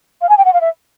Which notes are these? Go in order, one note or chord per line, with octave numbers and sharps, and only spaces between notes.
F5
G#5
G5
F#5
F5
E5